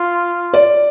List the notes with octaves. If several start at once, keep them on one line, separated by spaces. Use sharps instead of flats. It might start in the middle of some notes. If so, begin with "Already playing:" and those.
Already playing: F4
D5